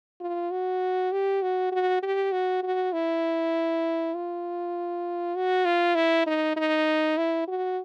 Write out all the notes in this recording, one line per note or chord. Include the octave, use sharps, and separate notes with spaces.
F4
F#4
G4
F#4
F#4
G4
F#4
F#4
E4
F4
F#4
F4
E4
D#4
D#4
E4
F#4